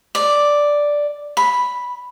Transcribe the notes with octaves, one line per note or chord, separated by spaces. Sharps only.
D5
B5